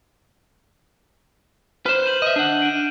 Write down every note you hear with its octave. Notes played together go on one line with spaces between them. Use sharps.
B4 C5 F6 E7
G6 D#7 F#7
D#5 E5
D4 F#5
D7 D#7